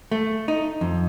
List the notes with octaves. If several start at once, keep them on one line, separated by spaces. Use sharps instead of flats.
A3
D#4
F2